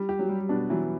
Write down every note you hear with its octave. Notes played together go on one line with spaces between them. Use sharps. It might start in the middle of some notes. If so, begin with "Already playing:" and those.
Already playing: G3
G4
F#3
G3
B2 D4
E3 F#3